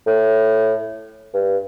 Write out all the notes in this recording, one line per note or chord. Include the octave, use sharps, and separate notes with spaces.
A2
G2